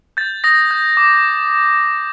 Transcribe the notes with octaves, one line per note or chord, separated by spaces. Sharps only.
G6 A6
D#6 A#6
G6
D6